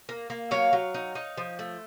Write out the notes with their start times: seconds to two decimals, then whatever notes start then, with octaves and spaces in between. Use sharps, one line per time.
0.09 A#3
0.30 A#3
0.51 F#3 C#5 F5
0.73 F#3
0.94 D#4
1.15 D#4
1.37 F3
1.59 A3